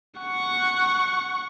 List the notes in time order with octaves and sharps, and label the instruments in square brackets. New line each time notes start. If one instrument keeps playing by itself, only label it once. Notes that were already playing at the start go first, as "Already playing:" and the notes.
[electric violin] F#5 C#6